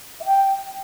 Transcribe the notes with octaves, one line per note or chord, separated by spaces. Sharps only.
E5
G5